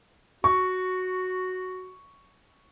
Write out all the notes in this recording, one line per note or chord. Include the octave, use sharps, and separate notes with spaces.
F#4 C#6